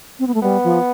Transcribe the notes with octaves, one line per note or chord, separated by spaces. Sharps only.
C4
B3
A3
G3 B3
F3